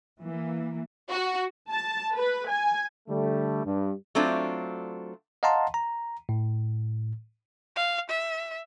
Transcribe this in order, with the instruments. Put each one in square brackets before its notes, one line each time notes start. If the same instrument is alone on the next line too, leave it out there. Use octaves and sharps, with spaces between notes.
[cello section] E3 A#3
[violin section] F#4
[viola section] A5
B4
G#5
[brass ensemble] D3 G3 A3
G2
[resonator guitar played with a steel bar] F#3 A3 C4 D4 F4
[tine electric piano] D#5 F5 F#5 A5 A#5 C6
A#5
A2
[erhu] F5
E5